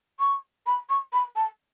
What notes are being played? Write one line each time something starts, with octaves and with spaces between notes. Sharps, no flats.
C#6
B5
C#6
B5
A5